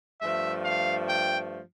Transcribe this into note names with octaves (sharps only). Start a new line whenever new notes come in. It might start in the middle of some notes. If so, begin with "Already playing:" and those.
G2 F3 A3 E5
F5
G5